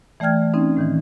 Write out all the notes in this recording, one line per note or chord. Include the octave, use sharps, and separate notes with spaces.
E3 A3 D5 G5 F6 G#6
C4 C#4 D#4
A2 D#3 E3